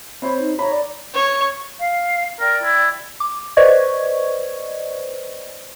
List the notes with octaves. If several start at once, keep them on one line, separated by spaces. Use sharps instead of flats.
C4 C5 C#5 B5
D#4
C#5 A#5 B5
D5
C#5
F5
A#4 D5 G5
E4
D6
B4 C5 D5 D#5 C#6 G#6